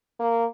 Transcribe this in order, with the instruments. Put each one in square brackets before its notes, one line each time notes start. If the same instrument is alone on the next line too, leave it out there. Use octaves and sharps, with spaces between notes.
[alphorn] A#3